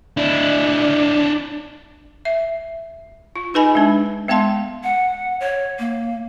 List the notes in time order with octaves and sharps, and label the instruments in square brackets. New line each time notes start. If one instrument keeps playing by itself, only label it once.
[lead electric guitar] D4 E4
[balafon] E5
F4
D#4 G#4 B4 D#5 G#5 B5
G#3 D4
G#3 B3 F5 A5 C6
[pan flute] F#5
C#5
A#3